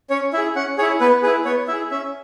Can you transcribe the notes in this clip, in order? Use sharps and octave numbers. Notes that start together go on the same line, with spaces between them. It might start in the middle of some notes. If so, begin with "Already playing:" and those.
C#4 C#5
E4 G#4 E5
C#4 F#5
E4 G#4 C#5
B3 B4
E4 G#4 B4
B3 C#5
E4 G#4 E5
C#4 E5